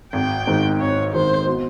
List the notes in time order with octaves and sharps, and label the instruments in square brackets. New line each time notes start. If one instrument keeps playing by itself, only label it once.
[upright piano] G#1 [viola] G5
[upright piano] G#2 D#3
[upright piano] G#1 [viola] C#5
[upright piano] G#2 D#3 [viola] C5
[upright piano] B2